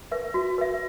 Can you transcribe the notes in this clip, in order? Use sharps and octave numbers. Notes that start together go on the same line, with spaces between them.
B4 E5
F#4
B4 E5